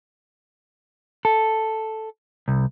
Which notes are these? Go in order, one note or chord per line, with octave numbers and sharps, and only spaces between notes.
A4
C2